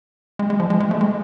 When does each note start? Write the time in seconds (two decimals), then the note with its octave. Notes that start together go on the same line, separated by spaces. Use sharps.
0.39 G#3
0.50 G#3
0.60 F3
0.70 G#3
0.80 G#3
0.91 A3
1.01 G#3